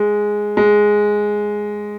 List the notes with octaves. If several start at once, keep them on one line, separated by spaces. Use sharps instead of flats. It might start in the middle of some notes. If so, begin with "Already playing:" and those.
Already playing: G#3
G#3